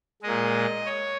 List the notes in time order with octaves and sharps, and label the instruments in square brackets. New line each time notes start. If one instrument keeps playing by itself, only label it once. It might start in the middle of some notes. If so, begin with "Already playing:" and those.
[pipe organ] A#2 G#3 D#5
C#5